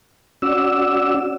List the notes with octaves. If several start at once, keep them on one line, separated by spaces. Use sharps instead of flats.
C#4 F#4 D5 E6